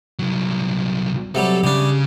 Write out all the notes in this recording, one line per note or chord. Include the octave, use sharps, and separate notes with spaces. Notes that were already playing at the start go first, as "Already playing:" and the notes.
C2 F#3
C3 F#3 G3 A4
C#3 G3 D4